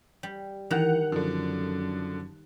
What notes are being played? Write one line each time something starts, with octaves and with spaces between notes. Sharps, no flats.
G3
D#3 E3 F#5 F#6 F7
F#2 D3 F3